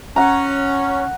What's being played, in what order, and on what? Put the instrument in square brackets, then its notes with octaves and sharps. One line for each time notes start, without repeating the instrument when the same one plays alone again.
[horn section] C#4 [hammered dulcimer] F#5 A#5